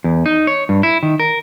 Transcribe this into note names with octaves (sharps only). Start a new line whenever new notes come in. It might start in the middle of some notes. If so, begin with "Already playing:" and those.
E2
D#4
C#5
G2
E4
D#3
A#4